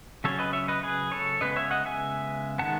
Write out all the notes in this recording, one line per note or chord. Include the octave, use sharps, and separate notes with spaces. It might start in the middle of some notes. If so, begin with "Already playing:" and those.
C#3 F#3 C#4 A4 C#5
B4 D#5
C#5 E5
B4 D#5
G#4 B4
A4 C#5
C#3 G#3 B3 B4 D#5
C#5 E5
D#5 F#5
E5 G#5
D#3 G#3 B3 F#5 A5